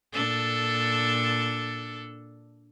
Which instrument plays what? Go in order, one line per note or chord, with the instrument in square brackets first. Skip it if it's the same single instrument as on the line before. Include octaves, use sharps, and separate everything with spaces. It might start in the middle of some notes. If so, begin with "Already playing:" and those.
[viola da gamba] A#2 D4 A4